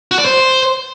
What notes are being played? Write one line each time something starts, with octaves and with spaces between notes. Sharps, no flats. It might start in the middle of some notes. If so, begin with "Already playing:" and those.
F#4
D5
C5